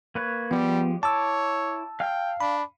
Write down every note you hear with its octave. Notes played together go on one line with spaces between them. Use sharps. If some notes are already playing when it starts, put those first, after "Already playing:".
A#3 B4 C#5
F3 G3 G#3 B3 G4
E4 C#5 A5 D6 E6
F5 G5 F6
D4 B5